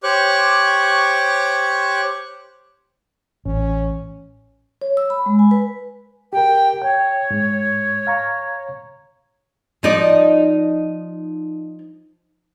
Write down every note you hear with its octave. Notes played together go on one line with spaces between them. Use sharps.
G4 C5 C#5 C#6 D6 F#6
A1 C#4
C#5
E6
B5
G#3
G#5
B4
G4 A#4 G5
C#5 G5
G#2
F5 A#5 C#6
F3 D#4 D5